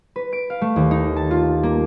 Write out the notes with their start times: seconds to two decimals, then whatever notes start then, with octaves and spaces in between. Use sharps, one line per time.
0.16 B4
0.32 D7
0.50 F5
0.61 A3
0.76 D#2
0.91 D#4
1.16 A5
1.31 F4
1.63 A#3